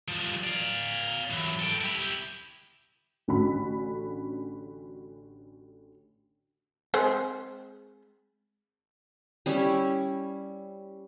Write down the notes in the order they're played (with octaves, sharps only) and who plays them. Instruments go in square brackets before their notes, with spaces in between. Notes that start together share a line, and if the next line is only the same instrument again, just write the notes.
[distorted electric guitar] F3 G3
D5 F5
E3 F#3
A4 G5
E4 G4
[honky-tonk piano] A1 D3 C#4 F#4 B5
[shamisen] G#3 C4 C5
[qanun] G3 C#4 E4